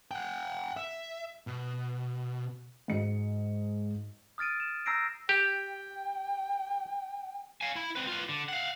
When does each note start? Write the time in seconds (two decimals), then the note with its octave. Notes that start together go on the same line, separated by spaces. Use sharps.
0.11 F#5 G5
0.77 E5
1.47 B2
2.88 G#2 F#4 D#5 C#7
4.38 D#6 F6 A6 D7 D#7
4.60 E7
4.86 A#5 E6 G6 A#6 C7 D7
5.29 G4 G5
7.61 F5 G#5
7.76 E4 B5
7.95 C4 B4
8.07 F4 B4
8.29 D3
8.49 F5 F#5